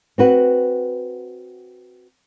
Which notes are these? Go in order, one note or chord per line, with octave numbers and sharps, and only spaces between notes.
C4 F#4 B4